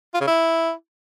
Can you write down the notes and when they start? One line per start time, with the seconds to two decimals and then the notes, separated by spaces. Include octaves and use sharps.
0.14 F4
0.21 C#3
0.27 E4